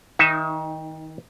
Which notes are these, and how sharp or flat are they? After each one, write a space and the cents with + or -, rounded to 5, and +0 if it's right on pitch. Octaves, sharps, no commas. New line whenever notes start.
D#3 +30 D#4 +0 E5 +0